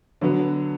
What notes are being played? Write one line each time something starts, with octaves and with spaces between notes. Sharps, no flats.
D3 F#3 B3